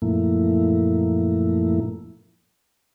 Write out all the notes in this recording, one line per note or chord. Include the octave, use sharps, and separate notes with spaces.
F#2 A#2 F3 A3 A#3 E4